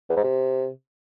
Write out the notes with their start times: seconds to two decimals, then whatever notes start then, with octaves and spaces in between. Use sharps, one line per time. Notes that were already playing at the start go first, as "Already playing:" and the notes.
0.09 E2
0.16 G#2
0.24 C3